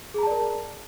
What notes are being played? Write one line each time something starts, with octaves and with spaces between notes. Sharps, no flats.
G#4 A#4 D5 A5 A#5